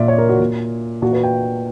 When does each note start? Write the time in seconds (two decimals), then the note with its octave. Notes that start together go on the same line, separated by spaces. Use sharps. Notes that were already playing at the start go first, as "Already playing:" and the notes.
Already playing: A#2 D5 E5
0.08 C#5
0.18 A#4
0.29 F#4
0.40 A#2
1.02 A#2 F#4
1.13 B4
1.23 G5